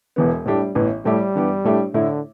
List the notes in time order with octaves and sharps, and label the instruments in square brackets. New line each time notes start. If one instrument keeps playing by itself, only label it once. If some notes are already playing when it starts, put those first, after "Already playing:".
[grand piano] E1 E2 E3 B3
[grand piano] A2 A3 D4 G4 [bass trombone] G3
[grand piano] A1 A2 E3 B3
[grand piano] A2 A3 G4 [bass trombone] G3
[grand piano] G2 E3 B3 G4
A2 A3 D4 G4
[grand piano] A2 A3 E4 [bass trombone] D3